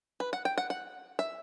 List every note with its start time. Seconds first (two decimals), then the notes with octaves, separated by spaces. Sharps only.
0.20 B4
0.33 F#5
0.45 G5
0.58 F#5
0.70 F#5
1.19 E5